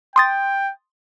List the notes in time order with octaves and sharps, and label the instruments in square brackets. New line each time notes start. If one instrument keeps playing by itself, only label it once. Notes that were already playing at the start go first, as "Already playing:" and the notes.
[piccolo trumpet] G5 [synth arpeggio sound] C6 D#6 A6